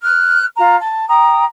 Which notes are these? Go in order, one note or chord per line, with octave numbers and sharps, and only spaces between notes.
F6 F#6
F4 A#5
A5
G5 A#5 D#6